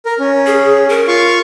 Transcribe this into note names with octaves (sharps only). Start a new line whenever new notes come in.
A#4
C#4
G#4
A#4
F4 F5 C#6